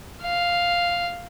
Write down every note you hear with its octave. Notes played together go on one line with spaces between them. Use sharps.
F5